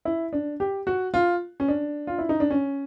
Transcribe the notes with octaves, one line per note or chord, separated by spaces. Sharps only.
E4
D4
G4
F#4
F4
C#4
D4
F4
E4
D#4
D4
C#4